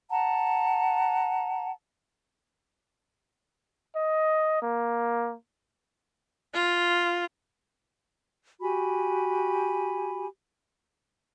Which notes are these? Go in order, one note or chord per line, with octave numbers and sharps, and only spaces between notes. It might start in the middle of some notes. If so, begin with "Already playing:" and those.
F#5 A5 A#5
D#5
A#3
F4
F#4 G4 G#5 B5